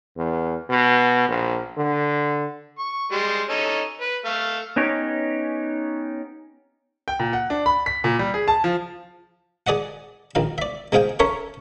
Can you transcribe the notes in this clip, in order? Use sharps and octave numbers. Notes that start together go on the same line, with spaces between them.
E2
B2
A#1
D3
C#6
G3 G#3 C6
C#4 D#4 A4
B4
A3 F5
B3 C#4 D#4 G4 C#5
G5
A#2
F#5
D4
B5
B6
A#2
G3
G#4
A5
F3
G#4 D5 D#5 F#5
A#1 D#3 F5
D5 E5
G#3 C4 G#4 F5 G5
C#4 A4 A#4 C#5 E5